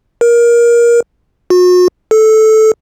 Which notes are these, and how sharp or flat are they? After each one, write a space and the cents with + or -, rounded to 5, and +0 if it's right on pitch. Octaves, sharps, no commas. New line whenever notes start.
A#4 +20
F#4 -40
A4 -10